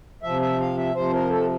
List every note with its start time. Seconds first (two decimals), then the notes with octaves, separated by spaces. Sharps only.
0.23 C3 F3 E5
0.41 E5
0.60 F5
0.77 E5
0.95 C3 F3 C5
1.13 A#4
1.30 A4